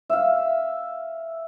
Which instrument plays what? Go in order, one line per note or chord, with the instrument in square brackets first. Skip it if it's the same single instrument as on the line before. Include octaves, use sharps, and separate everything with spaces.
[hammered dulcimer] E5 F5